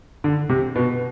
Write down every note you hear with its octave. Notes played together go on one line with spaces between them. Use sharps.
D3
C3
B2